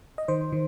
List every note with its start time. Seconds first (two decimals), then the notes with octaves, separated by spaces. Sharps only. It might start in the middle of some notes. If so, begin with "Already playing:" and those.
0.18 D#5
0.28 D#3 C5
0.52 D#3